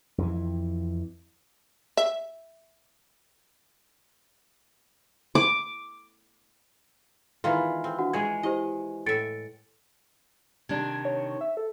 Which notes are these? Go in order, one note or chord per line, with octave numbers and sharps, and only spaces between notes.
F2 E3
E5
D6
D#3 E3 G#3 B3 F4
C4
D4 F#4 F#5
G#3 F#4 G#4 C#5 G#6
E4 G4 C5 D#5
A2 E5 A6 C#7 D7
C3 D#3 D4 G#6
C#5
E5
A4